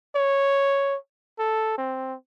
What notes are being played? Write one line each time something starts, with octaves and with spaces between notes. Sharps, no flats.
C#5
A4
C4